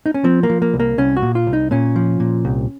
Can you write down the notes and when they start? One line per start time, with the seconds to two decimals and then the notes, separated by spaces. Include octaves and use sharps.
0.06 D#4
0.14 C#4
0.24 F3 C4
0.43 A#3
0.49 F3
0.62 A#3
0.74 C2
0.80 A#3
0.98 C2 C#4
1.17 F#4
1.22 A#2
1.35 F4
1.47 C2
1.53 D#4
1.71 A#2 C#4
1.96 F3
2.20 A#2
2.45 C2